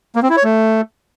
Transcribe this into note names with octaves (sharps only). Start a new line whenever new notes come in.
A#3
C4
E4
C#5
A3